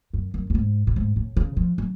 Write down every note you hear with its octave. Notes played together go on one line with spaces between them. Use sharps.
F#2
F#2
F#2
G#2
A2
G#2
A2
C#3
F3
F#3